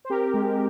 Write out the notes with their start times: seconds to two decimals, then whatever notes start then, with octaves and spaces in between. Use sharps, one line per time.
0.05 C5
0.10 C4 G4 A#4
0.34 G#3